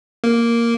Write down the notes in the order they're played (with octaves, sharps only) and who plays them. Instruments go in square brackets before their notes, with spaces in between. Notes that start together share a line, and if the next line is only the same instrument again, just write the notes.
[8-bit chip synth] A#3